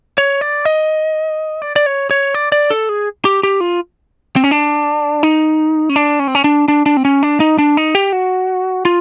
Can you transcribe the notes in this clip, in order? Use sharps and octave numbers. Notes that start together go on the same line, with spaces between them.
C#5
D5
D#5
D5
D5
C#5
C#5
D5
D5
A4
G#4
G4
G4
F4
C4
C#4
D4
D#4
C#4
D4
C#4
C4
C#4
D4
D4
D4
C4
C#4
D4
D#4
D4
D#4
G4
F#4
F4